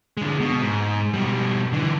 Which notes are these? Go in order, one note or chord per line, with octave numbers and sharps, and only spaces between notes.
D3 G#3
B2
G#2
B2 G3
D3 E3